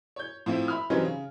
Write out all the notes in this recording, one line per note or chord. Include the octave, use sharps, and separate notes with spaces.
C#5 G6
A2 F3 C4 E4
E5 B5 F6
E3 F#3 G3 C4 C#4 D#4
C#3